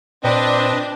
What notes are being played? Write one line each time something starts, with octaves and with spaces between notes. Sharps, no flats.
A#2 C4 D4 B4 D#5